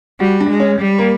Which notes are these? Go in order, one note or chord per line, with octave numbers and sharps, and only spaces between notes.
G3 F#4
D4
G#3
C#4
G3
A#3